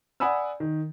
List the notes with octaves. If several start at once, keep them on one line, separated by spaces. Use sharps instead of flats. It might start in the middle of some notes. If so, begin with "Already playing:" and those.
D5 F#5 G#5 B5 D#6 E6
D#3